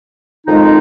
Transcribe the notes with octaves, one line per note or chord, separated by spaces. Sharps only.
F2 D#3 G#3 D#4